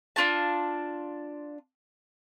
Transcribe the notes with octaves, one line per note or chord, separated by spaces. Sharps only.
D4 F4 F#4 A5